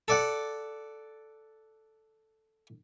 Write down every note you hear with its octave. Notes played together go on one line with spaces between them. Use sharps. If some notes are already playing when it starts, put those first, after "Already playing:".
A4 D5 F#5